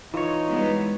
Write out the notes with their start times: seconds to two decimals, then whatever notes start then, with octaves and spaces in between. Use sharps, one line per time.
0.14 E3 D#4 F4 C#5
0.48 G3 G#3 B3